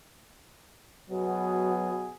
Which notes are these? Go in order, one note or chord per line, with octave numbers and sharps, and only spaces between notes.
B2 F#3 B3 G#4